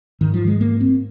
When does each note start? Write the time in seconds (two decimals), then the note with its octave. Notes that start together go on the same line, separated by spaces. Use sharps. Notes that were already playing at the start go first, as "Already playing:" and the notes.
0.21 G#2 D#3
0.34 F3
0.47 G#3
0.61 A#3
0.81 C4